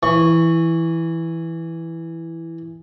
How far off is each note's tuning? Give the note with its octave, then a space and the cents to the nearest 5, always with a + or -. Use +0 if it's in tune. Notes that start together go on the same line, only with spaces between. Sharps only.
E3 +0 C#6 +0